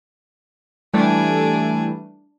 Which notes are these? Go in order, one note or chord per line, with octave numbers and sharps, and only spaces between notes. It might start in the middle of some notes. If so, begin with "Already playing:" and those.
E3 G3 A3 D4 G#5